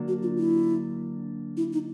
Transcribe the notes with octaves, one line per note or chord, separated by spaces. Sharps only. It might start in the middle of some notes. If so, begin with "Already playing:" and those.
Already playing: D3 F#3 A#3 D4
F#4
F4
E4
E4
D#4